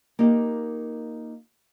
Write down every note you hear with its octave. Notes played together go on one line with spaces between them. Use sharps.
A#3 D#4 F4 G4